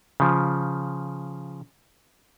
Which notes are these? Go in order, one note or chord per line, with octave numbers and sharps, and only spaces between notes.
C#3 F3